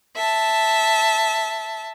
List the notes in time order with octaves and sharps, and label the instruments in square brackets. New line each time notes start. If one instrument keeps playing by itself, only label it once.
[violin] E5 A5